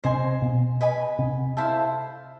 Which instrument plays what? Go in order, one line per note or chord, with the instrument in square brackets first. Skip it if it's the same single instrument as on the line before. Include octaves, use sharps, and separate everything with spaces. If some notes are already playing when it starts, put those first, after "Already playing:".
[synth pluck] C3 [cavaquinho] C5 D#5 G#5 C6
[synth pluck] B2
[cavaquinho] B4 D#5 G#5 B5
[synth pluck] C3
[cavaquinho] E4 A4 C5 F5